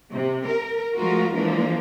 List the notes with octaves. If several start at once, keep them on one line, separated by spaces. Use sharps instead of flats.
C3
A#4
F3 G#3 A3 F4 F#4 A#4
E3 F3 G#3 A#3 D4